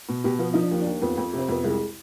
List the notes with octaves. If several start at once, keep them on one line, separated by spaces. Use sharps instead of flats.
B2
B2 G4
F3 B3
F3 D#4
D4
D#2
D4
D#2
F2 B3
F2
C3
C4
F2 B3
C2 G#3